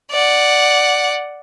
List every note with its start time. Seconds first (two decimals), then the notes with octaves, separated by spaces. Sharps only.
0.11 D5 F#5